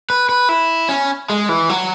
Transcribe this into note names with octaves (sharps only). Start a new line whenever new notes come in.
B4
B4
E4
C#4
G#3
E3
F#3